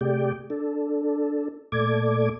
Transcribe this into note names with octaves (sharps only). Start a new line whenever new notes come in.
C3 A3 G4 G#4 D5 G5
D4 A4
A#2 A3 A4 D5 D6 G#6